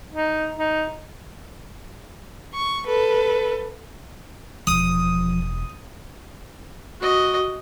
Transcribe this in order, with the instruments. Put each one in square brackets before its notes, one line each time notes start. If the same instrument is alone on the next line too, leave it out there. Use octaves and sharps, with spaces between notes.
[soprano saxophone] D#4
D#4
[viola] C#6
A4 B4
[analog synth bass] E1 [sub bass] F3 [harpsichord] D#6
[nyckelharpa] F#4 D#5